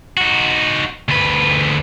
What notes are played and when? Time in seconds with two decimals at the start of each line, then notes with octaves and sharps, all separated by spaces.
0.17 D#4 F#4
1.09 D2 B4